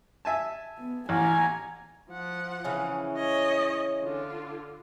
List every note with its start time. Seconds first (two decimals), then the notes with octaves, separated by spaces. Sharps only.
0.25 E5 G#5 A5
0.78 B3
1.09 A1 G#5 A#5
2.10 F3 F#5
2.64 C#3 E3 C#4
3.15 C#5 D#5
4.02 D3 F4